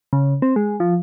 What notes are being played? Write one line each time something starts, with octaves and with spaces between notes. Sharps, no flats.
C#3
C4
G#3
F3